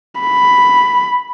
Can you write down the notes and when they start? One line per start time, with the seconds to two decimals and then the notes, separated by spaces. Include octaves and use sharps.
0.21 B5